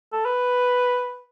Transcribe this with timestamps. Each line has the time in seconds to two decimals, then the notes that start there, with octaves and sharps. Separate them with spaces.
0.13 A4
0.25 B4